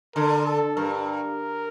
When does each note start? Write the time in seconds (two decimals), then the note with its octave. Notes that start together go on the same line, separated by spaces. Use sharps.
0.15 D3 A#4
0.45 A4
0.77 G2 A#4